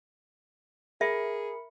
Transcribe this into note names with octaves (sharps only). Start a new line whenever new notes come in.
G#4 A#4 E5 B5 C#7